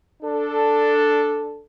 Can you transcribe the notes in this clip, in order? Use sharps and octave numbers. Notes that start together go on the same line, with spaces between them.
D4 A4